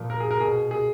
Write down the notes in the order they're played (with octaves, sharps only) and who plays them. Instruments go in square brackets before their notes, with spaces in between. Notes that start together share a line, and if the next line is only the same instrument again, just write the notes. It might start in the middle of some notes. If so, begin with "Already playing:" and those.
Already playing: [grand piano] A#2 F3
A#4
G#4
A#4
B2 G#4
G#4